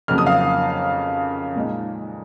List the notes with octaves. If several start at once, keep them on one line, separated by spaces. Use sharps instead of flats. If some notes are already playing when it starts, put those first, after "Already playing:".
F2 C#3 F#3 A#3 F6
D#6
F5 F6
A#2 G#3 D#4